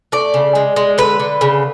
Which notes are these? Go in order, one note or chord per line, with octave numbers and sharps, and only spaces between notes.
A3 D5
C#3
G#3
G#3
D3 B4
D3
C#3